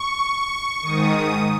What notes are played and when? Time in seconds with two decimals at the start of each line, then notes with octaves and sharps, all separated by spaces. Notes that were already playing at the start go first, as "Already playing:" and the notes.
Already playing: C#6
0.82 G#2 D#3 D#6